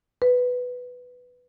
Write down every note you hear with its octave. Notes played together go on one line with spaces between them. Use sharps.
B4